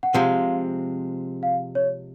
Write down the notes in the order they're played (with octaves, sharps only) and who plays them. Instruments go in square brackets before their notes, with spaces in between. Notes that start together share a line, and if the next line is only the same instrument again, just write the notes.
[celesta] F#5
[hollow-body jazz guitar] C3 F3 G#3 [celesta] F5
[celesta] F5
C#5